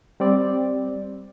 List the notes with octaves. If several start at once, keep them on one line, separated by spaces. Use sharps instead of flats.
G3 C4 D5